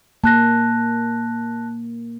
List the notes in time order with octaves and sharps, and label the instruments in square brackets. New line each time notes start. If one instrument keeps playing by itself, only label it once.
[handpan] A#3 [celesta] A5 F#6 A#6